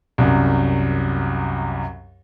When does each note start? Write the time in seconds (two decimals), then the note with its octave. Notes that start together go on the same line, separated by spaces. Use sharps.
0.18 C2 F#2